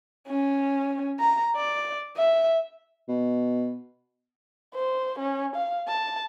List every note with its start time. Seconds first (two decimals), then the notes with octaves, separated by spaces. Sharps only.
0.28 C#4
1.20 A#5
1.56 D5
2.17 E5
3.08 B2
4.74 C5
5.19 C#4
5.56 F5
5.88 A5